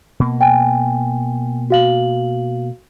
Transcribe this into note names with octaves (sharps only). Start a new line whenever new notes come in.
B2 A#3
G5 G#5
F#4 F5 F#7